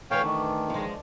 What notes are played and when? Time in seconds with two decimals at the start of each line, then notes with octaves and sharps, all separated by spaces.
0.11 D3 E3 A3 B4 C#5 F5 G5 C#6
0.24 D#3 D4 D5
0.70 F3 G#3